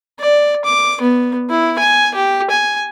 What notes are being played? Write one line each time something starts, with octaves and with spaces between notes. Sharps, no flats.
D5
D6
B3
E4
G#5
G4
G#5